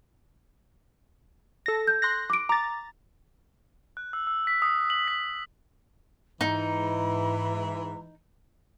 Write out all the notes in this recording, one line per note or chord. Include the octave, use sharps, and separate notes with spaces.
A4 A#6
G6
C6 F#6 A#6
D6 D7
A#5 D6 A6
F#6
E6
E6
B6
D#6
F#7
B6
G#2 E3 D#4 A#5